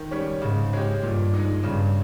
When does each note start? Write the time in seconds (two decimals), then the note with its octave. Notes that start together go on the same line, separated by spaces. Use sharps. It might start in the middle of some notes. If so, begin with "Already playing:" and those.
Already playing: D#3
0.11 G3 C#4
0.42 G#2 C#3
0.73 G#3 C#4 G4
1.03 G2 A#2
1.34 G#3 D#4
1.63 G2 C#3